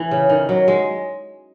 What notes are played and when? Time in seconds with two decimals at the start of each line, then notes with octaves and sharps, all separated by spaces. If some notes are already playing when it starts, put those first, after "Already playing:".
Already playing: E3
0.11 C#3
0.29 D#3
0.49 F#3
0.68 G#3